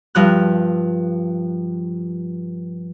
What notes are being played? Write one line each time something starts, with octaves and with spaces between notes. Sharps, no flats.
G2 F3 F#6